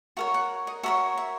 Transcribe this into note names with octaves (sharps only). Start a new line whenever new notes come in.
F#4 A#4 C#5 E5
F#5
D#5
F#4 A#4 C#5 E5
E5